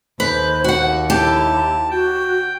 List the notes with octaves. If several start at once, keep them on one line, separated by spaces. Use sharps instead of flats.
D#2 B4 C5
F#4 F#5
E4 G4 A5
F#4 G5